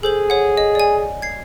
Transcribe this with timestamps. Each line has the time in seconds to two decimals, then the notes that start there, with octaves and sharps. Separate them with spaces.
0.03 G#4 A4 C5 F#7
0.30 C#5 F#5
0.57 D#5
0.75 D5 G#5
1.22 G#6 C7